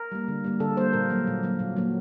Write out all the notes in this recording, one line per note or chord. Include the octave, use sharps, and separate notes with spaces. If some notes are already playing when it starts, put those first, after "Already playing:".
Already playing: A#4
G3 A#3
D3
G3 A#3
D3 A4
G3 A#3 C5
A#2 A#4
F#3 A#3
A#2
F#3 A#3
A#2
F#3 A#3